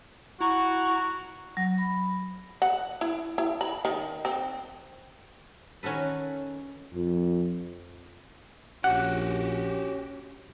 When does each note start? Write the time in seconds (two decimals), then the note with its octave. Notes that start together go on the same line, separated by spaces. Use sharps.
0.41 E4 F#4 A#5 C#6
1.57 F#3
1.78 B5
2.62 F#5
3.01 E4
3.38 E4
3.61 B5
3.85 D#3
4.25 C4
5.83 D#3 C#4 F#4 A4 B4
6.94 F2
8.84 A#1 C#4 F#4 G4 F#5